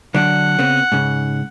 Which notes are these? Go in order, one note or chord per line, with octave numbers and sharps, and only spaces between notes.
D3 F#3 D4 F#5
C#3 B3 C4
G#2 C#3